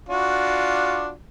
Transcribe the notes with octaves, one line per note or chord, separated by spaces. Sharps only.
D4 F4 F#4